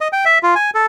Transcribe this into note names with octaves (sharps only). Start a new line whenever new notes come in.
D#5
G5
E5
F4
G#5
A4